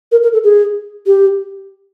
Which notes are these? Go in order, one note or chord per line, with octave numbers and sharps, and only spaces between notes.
A#4
A#4
A4
G#4
G4